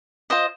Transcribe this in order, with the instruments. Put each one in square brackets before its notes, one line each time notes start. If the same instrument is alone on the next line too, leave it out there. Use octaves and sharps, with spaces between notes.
[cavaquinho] F4 C5 D#5